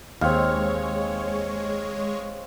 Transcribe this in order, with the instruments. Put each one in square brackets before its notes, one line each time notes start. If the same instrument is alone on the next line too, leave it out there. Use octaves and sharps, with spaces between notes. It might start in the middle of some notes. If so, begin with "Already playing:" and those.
[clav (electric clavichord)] D#2 [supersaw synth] G#3 C#5 [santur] C4 F5